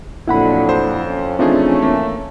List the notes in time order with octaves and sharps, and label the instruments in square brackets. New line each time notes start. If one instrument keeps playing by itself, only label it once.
[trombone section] F2 [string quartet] A#2 D3 F#3 [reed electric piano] E4 F#5 B5
[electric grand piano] C5
[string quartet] C#4
[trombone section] E3 A3 [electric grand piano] F3 D#4 G#4 [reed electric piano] C4 D4 F4
[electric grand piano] A#3